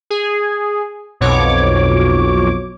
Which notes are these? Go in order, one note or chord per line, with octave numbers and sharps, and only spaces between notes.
G#4
B1 F2 B2 C#5 D6